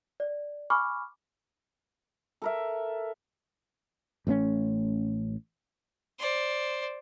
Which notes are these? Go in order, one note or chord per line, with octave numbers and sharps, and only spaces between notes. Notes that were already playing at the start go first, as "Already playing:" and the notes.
D5
G#5 B5 C#6 D6 F6
A4 A#4 E5
A1 A3 C4 C#4
C5 D5